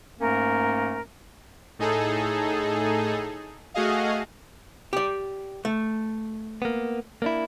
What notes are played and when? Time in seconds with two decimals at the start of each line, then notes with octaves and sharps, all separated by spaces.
0.20 G#2 A3 A#3 C#4 A#4
1.79 A2 D#4 G#4 A4
3.74 A3 F#4 G#4 D#5 F5
4.93 G4 D5
5.65 A3
6.62 A#3 B3
7.22 A#3 D4 E4